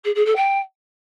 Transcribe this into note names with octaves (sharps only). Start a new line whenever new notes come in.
G#4
G#4
A4
G5